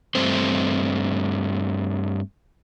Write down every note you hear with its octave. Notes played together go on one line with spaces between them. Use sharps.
G2 A3 C4 C5